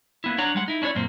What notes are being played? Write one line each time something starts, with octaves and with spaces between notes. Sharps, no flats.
A#3 B3 E4
D4 C#5 F#5 A#5
G3 G#3 F#5
D#4 E4
C#4 D4 E4 C#5 D5
F#2 A#2 A#3 C4